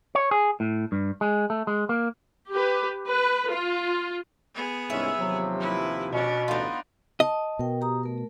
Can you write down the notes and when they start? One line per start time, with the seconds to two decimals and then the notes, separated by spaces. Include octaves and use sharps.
0.15 C#5
0.31 G#4
0.60 A2
0.92 G2
1.21 G#3
1.50 A3
1.67 G#3
1.89 A#3
2.51 G4 B4
3.08 B4
3.51 F4
4.55 B3 G#4
4.90 C2 G#2 C#4 E5
5.19 D#2 C3 F3 F#3
5.60 E4 B4
6.12 B2 C#4 D4
6.48 A1 D2 B3 D4 D#4 F4
7.20 D#5 A5
7.59 B2 A#4 G5
7.81 G4 A#5 D#6
8.03 A3 A#4